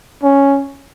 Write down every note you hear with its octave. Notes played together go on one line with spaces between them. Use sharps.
C#4